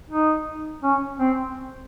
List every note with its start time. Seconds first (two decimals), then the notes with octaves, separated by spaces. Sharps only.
0.10 D#4
0.83 C#4
1.19 C4